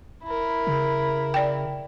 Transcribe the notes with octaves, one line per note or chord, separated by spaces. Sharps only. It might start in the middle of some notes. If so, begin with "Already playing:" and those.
E4 A#4
C#3
D5 G5